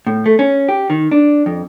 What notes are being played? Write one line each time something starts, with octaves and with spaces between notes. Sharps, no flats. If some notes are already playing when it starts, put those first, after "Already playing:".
A2
A3
C#4
G4
D#3
D4
F2